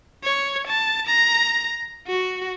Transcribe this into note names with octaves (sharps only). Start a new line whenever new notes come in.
C#5
A5
A#5
F#4